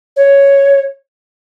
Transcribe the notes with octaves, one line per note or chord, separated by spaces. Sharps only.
C#5